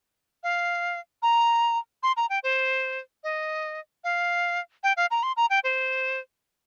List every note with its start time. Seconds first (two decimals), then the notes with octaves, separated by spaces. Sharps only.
0.43 F5
1.22 A#5
2.03 C6
2.17 A#5
2.30 G5
2.43 C5
3.24 D#5
4.04 F5
4.83 G5
4.97 F5
5.11 A#5
5.23 C6
5.37 A#5
5.50 G5
5.64 C5